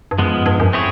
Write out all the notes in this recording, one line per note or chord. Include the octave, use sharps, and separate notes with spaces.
G2
F#2 F3 G#3 B3
G#2
G2
F#2
C4 E4 G#4 C#5